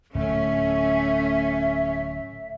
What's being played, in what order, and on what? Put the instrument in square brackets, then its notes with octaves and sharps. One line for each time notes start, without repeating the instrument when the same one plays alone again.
[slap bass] D1 [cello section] A3 C#4 [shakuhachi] E5